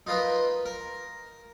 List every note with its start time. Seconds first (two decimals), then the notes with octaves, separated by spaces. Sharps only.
0.07 D#4 F4 A#4 B4 D#5
0.65 A#4